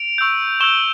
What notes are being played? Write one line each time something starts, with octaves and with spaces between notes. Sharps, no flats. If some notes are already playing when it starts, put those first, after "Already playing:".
Already playing: D7 F7
C#6 E6 G6
C#6 E6 G6 E7 G7